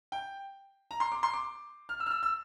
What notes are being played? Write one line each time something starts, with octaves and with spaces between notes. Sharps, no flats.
G5
A#5
C6
D6
C6
D6
F6
E6
F6
E6
E6